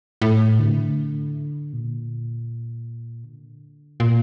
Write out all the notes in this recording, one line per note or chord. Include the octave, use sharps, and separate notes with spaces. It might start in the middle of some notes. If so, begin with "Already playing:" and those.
A2
D3
A#2
D3
A#2